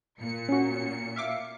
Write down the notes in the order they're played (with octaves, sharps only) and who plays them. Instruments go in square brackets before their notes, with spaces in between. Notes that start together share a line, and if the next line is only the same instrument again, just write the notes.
[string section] A#2 C#7
[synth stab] C#4 F#4
E5 F5 D6